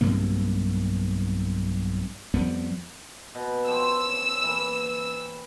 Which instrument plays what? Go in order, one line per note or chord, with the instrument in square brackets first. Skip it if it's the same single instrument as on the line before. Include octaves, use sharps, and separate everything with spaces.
[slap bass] B1 G2 C3 A#3
F2 F3 G3 B3
[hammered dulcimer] B2
[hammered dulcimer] F3 C4 C#5 [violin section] E6
[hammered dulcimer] E3 A#3